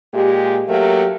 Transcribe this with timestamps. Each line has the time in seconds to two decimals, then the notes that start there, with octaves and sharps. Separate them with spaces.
0.14 A#2 G#3 G4
0.68 F#3 A3 A#3 G4 A#4